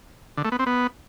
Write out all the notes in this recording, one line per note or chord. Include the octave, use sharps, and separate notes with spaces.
D3
A3
B3
C4
B3